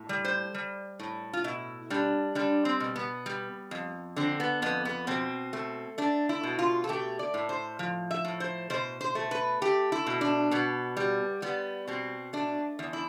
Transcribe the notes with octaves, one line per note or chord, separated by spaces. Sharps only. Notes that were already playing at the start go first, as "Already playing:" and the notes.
Already playing: A2
G3
C5
G3
A2
F4
B2 E4
G3 D4
G3 D4
C4
B2
B3
G3
F2
D3 C4
B3
F2 B3
B3
B2 C4
A3
A3 D4
E4
B2
F4
A4
A3 G4
D5
A2
C5
F3
E5
A2
C5
B2 C5
C5
A3
B4
A3 G4
E4
B2
D4
B2 B3
G3
G3 B3
B2 C4
A3 D4
E2
E4